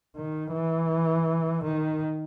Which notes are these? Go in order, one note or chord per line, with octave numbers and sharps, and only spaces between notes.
D#3
E3
D#3